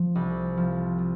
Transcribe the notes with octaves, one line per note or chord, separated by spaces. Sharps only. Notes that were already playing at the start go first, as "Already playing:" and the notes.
Already playing: F3
C2
F3
F3